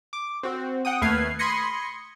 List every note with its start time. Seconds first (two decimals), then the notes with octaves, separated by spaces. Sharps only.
0.13 D6
0.43 C4 F#4
0.85 F#5 G5 D#6
1.01 D#2 A3 B4 F6 G#6 C7
1.39 B5 C6 D#6 G#6 A#6 C#7